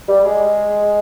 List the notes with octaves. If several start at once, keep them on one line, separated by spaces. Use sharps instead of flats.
G3
G#3